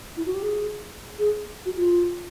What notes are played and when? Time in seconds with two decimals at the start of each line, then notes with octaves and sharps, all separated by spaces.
0.16 E4
0.26 F#4
0.34 G4
0.42 G#4
1.18 G#4
1.65 F#4
1.75 F4